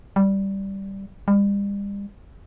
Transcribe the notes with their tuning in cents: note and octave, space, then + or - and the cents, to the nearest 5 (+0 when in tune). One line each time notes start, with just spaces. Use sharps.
G3 -5
G3 +40